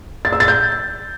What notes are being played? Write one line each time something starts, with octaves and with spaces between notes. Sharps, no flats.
A6
E6
A6
G6